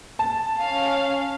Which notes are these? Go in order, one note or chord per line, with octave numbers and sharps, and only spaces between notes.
A5
C#4 F5